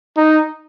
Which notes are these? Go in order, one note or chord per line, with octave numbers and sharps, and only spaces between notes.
D#4